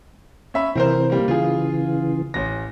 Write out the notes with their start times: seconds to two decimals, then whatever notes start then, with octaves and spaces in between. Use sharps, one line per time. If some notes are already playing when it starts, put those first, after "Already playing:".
0.54 C#4 E5 B5
0.75 C3 E3 C4 A#4 C5
1.10 G3 A#3
1.28 C#3 E3 F4 G#4
2.34 A1 A#6